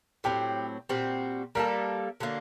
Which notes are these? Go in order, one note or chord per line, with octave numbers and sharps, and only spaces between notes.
A2 F#3 C4 G4
A#2 G3 C4 F#4
G3 A#3 D#4 A4 A#4
D3 F#3 A#3 D4